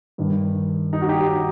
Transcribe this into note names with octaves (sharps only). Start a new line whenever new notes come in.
G2 D#3
D#4
F#4
D#4 G4